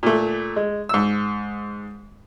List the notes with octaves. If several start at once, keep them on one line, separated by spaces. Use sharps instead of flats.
A#2 A3
G#3
G#2 E6